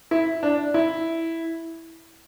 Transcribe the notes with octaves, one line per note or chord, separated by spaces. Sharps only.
E4
D4
E4